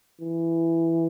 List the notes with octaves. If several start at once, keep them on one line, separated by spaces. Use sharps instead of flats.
E3